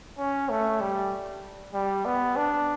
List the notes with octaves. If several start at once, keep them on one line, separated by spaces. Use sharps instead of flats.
C#4
A3
G3
G3
B3
D4